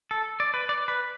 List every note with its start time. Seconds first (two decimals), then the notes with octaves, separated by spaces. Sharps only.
0.11 A4
0.40 D5
0.54 B4
0.69 D5
0.88 B4